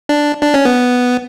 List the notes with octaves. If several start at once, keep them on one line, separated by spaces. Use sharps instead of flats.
D4
D4
C#4
B3